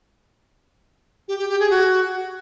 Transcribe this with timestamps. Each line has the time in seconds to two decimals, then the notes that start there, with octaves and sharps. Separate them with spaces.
1.28 G4
1.39 G4
1.49 G4
1.60 G#4
1.70 F#4